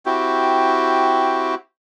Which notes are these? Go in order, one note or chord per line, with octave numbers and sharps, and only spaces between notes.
C4 E4 F#4 G4